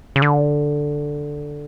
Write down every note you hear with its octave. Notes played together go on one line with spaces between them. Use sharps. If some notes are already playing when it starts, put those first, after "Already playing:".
C#3
D3